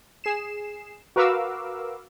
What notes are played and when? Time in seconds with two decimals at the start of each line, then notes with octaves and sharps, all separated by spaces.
0.24 G#4 C7 E7
1.16 F#4 A#4 B4 F5 D6 E6